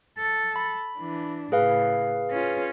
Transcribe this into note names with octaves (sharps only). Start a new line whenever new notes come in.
A4
B5
E3 D4
A2 C#3 G#4 B4 F5
C#4 F4